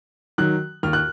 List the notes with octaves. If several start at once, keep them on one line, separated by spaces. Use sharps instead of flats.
D#3 F#3 F#6
D#2 F6
F#6